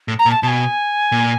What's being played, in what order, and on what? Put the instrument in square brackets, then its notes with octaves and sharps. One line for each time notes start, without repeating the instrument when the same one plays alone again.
[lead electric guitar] A2
[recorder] A#5
[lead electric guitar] A#2
[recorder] A5
[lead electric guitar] B2 [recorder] G#5 A5
[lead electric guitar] A#2